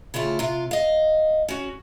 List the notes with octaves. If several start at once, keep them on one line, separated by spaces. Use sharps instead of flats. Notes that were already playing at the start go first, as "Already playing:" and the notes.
C#3 A3 E4 F4
C3 F4 F5
D#5 F5
C#4 F#4